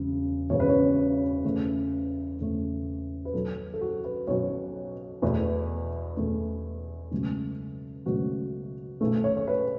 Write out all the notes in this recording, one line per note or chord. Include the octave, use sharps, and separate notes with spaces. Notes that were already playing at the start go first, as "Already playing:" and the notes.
Already playing: E1 E2 C#3
E1 E2 C#3 C#5
B4
C#5
E2 C#3 A3
E2 C#3 A3
B4
B1 B2 F#3 A4
A4
F#4
B4
B1 B2 F#3 C#5
E2 B2 A3 B4
E2 B2 A3 A4
C#2 B2 F#3 A3
C#2 B2 F#3 A3 F#4
B1 B2 A3
C#5
C#5
B4